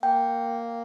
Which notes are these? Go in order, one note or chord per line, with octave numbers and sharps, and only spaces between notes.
A#3 G5